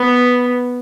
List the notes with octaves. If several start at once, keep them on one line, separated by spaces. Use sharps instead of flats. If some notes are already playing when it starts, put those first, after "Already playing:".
Already playing: B3